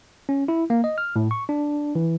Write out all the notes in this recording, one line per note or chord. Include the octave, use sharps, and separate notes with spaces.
C#4
E4
A#3
D#5
F6
A2
C#6
D4
E3